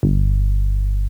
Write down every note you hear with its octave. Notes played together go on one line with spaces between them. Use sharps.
G1